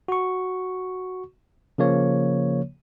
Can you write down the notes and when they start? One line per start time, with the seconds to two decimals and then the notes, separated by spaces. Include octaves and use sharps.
0.08 F#4 C#6
1.78 C#3 F3 A#3 C#5